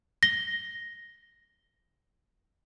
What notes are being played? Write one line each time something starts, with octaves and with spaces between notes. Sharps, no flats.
A#6 G7